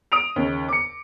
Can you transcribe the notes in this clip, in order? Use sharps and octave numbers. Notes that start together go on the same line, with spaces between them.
D#6 D7 F7
D#2 C#3
D6 C#7